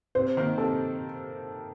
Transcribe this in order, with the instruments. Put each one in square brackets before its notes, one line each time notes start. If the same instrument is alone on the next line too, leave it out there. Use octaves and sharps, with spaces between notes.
[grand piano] C3 [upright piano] C5
[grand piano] D#3 A#3
[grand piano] C3 [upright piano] A4